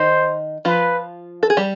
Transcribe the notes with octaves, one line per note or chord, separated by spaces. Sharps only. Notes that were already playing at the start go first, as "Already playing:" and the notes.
Already playing: D#3 D#4 C5
F3 F4 B4
A4
G#4
G3 G4